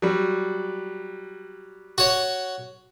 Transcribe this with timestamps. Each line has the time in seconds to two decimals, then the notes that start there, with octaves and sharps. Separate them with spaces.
0.02 F#3 G3
1.98 F#4 C#5